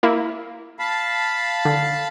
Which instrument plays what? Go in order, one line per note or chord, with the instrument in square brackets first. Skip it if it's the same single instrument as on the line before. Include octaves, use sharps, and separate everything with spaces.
[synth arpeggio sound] A#3 E4
[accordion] F5 A5 B5
[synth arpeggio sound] D3